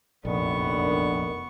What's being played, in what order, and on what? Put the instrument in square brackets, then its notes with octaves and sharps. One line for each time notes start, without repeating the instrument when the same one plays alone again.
[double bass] F1 F#2 [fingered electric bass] A#1 [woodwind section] D3 D#3 [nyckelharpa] B3 C#6